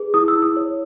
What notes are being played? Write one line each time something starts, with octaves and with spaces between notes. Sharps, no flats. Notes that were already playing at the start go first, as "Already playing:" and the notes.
Already playing: G#4 B4
E4 D#6
E6
E4
D#6
C#5